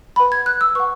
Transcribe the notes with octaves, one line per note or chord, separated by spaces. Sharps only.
B4 F#5 B5
G#6
F#6
E6
B4 F#5 C#6